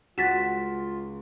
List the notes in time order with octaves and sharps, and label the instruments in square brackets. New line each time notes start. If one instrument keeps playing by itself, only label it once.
[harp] C#2 [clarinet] F4 [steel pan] F#4 [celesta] A6 B6 E7